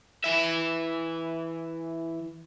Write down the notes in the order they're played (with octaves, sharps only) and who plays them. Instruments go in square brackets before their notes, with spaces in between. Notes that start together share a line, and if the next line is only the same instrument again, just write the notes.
[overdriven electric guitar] E3 E5